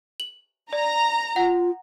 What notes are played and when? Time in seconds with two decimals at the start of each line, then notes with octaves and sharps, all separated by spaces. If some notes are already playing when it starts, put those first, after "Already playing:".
0.20 F#7
0.73 D5 A#5
1.36 F4 F#5